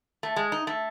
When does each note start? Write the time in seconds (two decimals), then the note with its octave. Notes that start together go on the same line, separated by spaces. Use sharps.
0.23 A3
0.36 G#3
0.52 D#4
0.67 A3